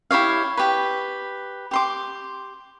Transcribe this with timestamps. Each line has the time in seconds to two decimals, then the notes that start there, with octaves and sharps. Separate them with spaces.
0.11 E4 G4 C#5 F5
0.57 G4 B4
1.71 G4 C6 D6